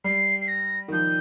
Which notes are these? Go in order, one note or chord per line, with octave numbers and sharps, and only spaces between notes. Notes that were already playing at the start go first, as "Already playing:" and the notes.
G3 C7
C7
A#6
D#3
F3 G6